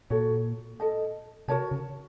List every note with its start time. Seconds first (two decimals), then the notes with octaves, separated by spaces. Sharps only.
0.10 A#2 F#4 A4 C#5
0.80 A4 D#5 A5
1.48 C3 F#4 A#4 C#5 A5
1.71 C#3